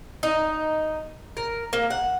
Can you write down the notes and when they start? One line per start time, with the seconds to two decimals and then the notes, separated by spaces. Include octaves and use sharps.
0.23 D#4
1.37 A#4
1.73 A#3
1.90 F#5